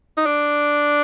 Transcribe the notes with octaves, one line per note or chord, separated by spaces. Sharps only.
D#4
D4